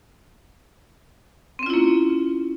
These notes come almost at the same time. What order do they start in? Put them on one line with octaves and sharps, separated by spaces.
C4 C#4 F4 E4 A#3